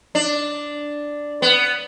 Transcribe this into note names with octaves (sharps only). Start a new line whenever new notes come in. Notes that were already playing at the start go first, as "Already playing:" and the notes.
D4
B3